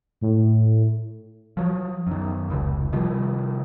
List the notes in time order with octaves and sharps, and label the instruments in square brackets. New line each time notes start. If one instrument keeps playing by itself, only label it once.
[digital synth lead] A2
[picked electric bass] F3 F#3
F#2 D#3
F1 C#2
C3 D#3 F3 G3